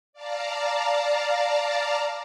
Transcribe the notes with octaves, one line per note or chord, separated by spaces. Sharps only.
D5 F5 A5 A#5